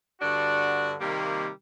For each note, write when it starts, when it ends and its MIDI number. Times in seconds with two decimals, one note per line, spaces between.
0.20 0.93 43
0.20 0.93 50
0.20 0.93 62
0.20 0.93 66
1.00 1.48 48
1.00 1.48 51
1.00 1.48 55
1.00 1.48 58